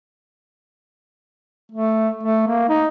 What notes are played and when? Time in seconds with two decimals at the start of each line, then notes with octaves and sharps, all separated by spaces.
1.71 A3
2.23 A3
2.48 A#3
2.69 D#4